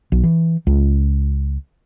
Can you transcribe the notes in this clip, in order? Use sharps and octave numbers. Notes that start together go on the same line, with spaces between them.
B1
E3
C#2